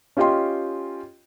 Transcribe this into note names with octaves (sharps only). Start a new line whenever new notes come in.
C#4 F4 G4 D#5 G5 C6